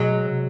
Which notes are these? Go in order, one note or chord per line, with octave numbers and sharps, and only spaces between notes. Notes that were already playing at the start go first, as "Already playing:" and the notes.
Already playing: B2 F#3 G#3
C3